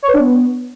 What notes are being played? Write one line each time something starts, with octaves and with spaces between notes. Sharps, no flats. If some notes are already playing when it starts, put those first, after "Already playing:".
C#5
B4
D4
B3